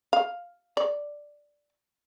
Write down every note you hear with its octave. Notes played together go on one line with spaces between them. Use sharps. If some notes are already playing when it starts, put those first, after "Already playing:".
F5
D5